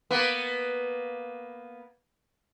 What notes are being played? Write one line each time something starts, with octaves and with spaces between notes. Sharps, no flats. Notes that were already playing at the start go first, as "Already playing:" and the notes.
A#3 B3